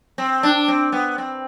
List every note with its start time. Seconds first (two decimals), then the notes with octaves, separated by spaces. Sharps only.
0.18 C4
0.43 D4
0.68 C4
0.92 B3
1.18 C4